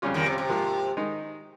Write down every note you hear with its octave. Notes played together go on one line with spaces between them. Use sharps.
F2 C#3 G3 C#4 F4
D#2 D#3
C3
C3
G#2 F3 A#3
D#3 G#3 D#4